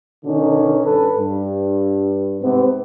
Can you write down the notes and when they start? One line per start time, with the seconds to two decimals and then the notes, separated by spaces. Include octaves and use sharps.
0.25 B2 D3 D#3 C#4 D#4
0.86 G2 A4 B4
1.17 G2
2.41 G#2 C3 B3 C4